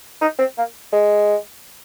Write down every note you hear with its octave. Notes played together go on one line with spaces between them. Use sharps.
D#4
C4
A#3
G#3